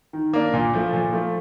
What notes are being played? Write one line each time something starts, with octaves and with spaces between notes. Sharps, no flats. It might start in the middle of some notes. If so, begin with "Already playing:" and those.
D#3
A#3 D4
A#2
F3 A3
A#2
F3 A3